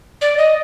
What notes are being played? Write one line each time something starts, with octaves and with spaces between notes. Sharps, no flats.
D5
D#5